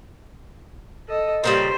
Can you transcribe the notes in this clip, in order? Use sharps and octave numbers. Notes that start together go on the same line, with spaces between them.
A4 D#5
A#2 C#3 G3 G4 C5